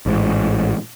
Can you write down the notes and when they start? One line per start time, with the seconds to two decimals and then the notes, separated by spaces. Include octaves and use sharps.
0.06 A1 G#2